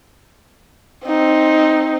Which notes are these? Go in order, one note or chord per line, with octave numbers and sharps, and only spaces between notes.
C4 D#4